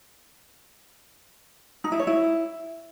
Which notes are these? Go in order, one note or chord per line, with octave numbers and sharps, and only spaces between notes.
D#4
E4
C#5
E4